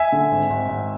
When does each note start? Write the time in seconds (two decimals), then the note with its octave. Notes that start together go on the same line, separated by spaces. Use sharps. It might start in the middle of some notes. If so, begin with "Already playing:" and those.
Already playing: E5 G#5
0.12 D3
0.32 G#1
0.50 G#1
0.69 G#1